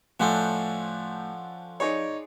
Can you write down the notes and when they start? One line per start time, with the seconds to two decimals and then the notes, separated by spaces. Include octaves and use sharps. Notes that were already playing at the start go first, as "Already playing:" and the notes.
0.20 A2 F3 C#4 D4 A4 C5 F#5
1.80 D#4 G#4 C#5 D5